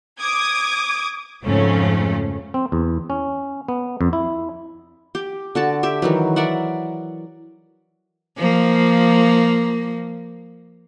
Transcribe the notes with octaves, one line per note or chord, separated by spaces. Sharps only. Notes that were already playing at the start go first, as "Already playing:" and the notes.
D6 D#6 G#6
F2 G#2 C#3 F3 A3 C#4
C4
E2
C#4
B3
F2
E4
G4
D3 F#4 A5
G4 E5
D#3 E3 F#3
A#4 D5 E5 F#5
F3 A#3